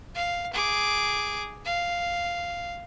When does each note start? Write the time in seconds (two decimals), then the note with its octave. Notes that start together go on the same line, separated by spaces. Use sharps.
0.15 F5
0.53 G#4 D6
1.65 F5